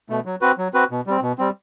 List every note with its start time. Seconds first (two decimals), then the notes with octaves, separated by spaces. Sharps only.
0.09 B2 A3
0.26 F#3
0.41 C4 F#4 B4
0.58 F#3
0.74 C4 F#4 B4
0.91 B2
1.07 G3 C4
1.22 B2
1.38 G3 C4